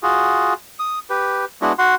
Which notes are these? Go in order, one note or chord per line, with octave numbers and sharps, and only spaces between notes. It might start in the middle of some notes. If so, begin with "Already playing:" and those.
F4 F#4 G#4
D#6
G4 B4
G#3 B3 D4 E4 F#4
F#4 F#5 C6